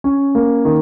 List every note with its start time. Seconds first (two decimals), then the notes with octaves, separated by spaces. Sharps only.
0.04 C#4
0.35 A#3
0.65 D#3